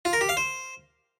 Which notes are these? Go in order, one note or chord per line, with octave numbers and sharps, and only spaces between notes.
F4
A#4
G4
F5
C5